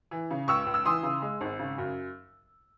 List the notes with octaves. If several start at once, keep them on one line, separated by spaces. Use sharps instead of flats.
E3
C#3
C#2 C#6 E6
C#2
E6
E3 C6 D#6
C#3
G#3
G#1
C#3
F#2